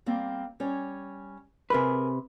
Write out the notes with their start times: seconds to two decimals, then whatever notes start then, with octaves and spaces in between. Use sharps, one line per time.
0.06 G3 A#3 C4
0.60 G3 C#4 C#5
1.70 C3 G#4 A#4 B4 G#5